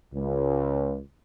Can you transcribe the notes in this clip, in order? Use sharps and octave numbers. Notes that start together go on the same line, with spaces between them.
C#2